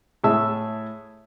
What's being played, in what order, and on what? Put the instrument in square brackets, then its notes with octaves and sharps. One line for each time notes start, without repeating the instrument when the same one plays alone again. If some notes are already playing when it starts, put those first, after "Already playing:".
[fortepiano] A2 E4 G#4 E5 A5 E6